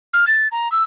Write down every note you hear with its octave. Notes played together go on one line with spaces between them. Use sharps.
F6
A6
A#5
E6